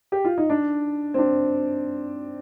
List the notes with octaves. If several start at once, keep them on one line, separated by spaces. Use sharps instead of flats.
G4
F4
D#4
D4
C4
D4